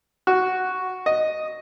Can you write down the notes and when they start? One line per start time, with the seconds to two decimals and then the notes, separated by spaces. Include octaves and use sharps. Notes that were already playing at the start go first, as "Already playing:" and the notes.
0.27 F#4
1.06 D#5